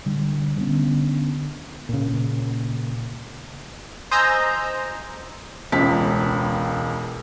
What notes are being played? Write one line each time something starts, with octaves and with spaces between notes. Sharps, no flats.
D3 G3
D3 B3 C#4
A#2 C#3
C5 D#5 G#5 A#5 E6 G6
E1 C#2 B6